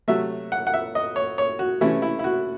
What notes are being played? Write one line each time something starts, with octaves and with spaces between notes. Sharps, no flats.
C3 F#3 A3 E5
F#5
F#5
E5
D#5
C#5
C#5
F#4
C3 E3 A3 C#4 E4
E4
E4
F#4